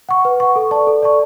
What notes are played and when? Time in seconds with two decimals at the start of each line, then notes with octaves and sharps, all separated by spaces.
0.09 F#5 C#6
0.25 B4
0.40 F#5 C#6
0.56 A4
0.71 D5 A5 C#6
0.87 A4
1.03 D5 A5 C#6